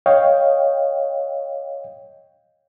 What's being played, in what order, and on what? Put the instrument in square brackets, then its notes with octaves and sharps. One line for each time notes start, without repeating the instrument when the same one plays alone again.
[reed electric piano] C#5 D#5 F5 G5